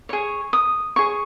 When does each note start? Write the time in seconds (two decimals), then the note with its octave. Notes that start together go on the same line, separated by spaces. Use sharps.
0.09 G#4 C#5 C#6
0.53 D#6
0.96 G#4 C#5 C#6